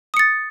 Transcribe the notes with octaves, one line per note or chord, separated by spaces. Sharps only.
D#6 A6 C#7